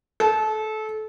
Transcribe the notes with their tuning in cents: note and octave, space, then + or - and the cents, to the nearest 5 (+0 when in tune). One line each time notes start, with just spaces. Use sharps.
A4 -25